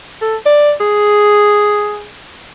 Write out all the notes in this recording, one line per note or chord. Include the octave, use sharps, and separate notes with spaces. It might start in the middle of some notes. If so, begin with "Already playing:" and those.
A4
D5
G#4